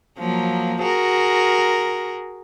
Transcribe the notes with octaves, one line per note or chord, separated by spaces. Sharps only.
F3 F#3 A#3
F#4 G#4 A#4